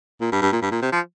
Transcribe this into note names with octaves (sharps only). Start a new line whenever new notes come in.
A#2
G2
G2
A#2
G2
A#2
C3
F3